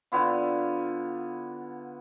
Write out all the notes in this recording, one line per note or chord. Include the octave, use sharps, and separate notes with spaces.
D3 B3 E4 F4